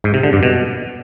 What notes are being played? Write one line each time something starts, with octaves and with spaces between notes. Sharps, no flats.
G#2
C3
D3
G2
B2